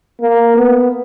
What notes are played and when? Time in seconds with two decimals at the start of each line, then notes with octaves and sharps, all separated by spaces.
0.21 A#3
0.56 B3